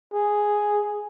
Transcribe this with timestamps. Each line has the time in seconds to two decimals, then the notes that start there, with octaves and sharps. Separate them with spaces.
0.14 G#4